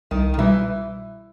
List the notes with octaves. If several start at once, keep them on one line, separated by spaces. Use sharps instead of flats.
C2 D#3
D#3
B2 E3 G3